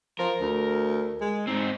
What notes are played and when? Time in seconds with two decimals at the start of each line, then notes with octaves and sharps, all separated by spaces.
0.19 F3 A#4
0.40 D2
1.21 G#3
1.47 G#2 C4 D#4